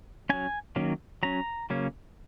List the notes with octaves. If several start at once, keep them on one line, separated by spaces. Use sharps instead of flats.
F#3 C#4 G#5
D#3 F#3 A#3 C#4
F#3 C#4 A#5
C#3 F#3 A#3 C#4